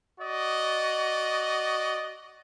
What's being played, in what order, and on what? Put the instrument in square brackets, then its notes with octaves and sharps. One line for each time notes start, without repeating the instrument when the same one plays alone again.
[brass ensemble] F#4 D5 D#5